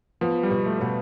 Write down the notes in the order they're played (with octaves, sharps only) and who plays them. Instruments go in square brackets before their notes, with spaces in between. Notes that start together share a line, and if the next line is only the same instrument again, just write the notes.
[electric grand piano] F3 [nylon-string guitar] B3
[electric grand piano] G3
[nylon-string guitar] B2
[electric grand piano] A3
[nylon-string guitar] B2